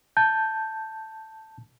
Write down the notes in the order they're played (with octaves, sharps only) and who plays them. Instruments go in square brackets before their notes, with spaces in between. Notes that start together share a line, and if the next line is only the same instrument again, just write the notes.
[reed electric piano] A5 G6